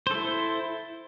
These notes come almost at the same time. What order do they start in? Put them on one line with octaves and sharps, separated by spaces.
C5 A4 E4